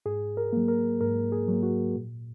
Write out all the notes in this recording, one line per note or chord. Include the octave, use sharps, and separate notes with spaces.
G#2 G#4
A#4
F#3 A#3
A#4
G#2 A#4
G#4
F#3 A#3
F#4
A#2